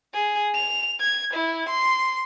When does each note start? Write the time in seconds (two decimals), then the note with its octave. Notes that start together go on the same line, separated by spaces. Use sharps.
0.14 G#4
0.55 F7
1.00 G#6
1.34 E4
1.69 C6